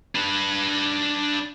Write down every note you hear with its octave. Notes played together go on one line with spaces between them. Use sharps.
D4 B4